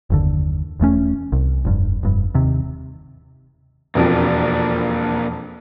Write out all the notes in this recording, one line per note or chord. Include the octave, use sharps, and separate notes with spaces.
F#1 D#2 D3
E1 E2 A3 C#4
C2
F1 G2
F1 G2
D#2 C3
E1 F2 A#3 D4 A#4